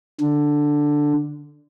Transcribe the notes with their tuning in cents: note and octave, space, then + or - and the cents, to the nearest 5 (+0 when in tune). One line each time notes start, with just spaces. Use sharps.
D3 +5